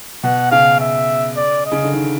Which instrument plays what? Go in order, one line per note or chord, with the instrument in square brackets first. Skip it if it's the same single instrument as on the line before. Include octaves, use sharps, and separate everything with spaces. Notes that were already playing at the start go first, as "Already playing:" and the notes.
[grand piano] B2 [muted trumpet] F#5
[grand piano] C#3 [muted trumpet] F5
[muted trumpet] E5
D5
D#5
[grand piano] C#3
D3
D#3